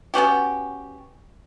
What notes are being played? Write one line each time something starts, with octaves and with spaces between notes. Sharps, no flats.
B3 C#4 F#4 G4